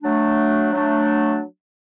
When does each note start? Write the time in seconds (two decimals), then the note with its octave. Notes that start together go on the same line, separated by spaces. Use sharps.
0.02 F#3 A3 D4
0.72 F#3 A3 D4